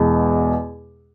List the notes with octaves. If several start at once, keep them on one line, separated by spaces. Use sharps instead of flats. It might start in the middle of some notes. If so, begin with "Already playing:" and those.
Already playing: E2 B2 G#3